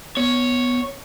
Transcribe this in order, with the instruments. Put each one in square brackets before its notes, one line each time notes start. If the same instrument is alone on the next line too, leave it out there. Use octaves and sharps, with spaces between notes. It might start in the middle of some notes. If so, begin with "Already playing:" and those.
[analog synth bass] B3 [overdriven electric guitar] C#5